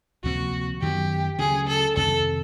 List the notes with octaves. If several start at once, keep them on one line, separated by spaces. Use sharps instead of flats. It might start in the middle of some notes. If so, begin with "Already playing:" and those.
D2 C3 F3 A#3 F#4
F#2 D#3 F#3 B3 G4
D2 C#3 F#3 A3 G#4
A4
F2 C3 D#3 A4